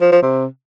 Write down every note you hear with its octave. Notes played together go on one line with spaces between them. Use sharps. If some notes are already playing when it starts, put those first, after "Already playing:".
F3
F3
C3